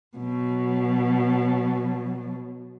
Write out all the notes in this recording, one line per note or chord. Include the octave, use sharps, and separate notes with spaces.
B2 F#3